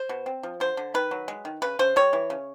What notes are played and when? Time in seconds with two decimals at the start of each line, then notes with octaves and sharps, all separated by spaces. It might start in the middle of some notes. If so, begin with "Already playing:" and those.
Already playing: C5
0.09 B2
0.26 C4
0.43 F3
0.60 D3 C5
0.77 D3
0.94 D#3 B4
1.11 F#3
1.28 G#3
1.45 D#3
1.62 C#3 B4
1.79 C#3 C5
1.96 G3 C#5
2.13 E3
2.30 C#3